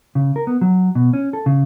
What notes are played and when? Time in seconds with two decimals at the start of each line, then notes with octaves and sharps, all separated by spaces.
0.15 C#3
0.36 A#4
0.47 B3
0.61 F#3
0.95 B2
1.13 C#4
1.33 A4
1.46 C#3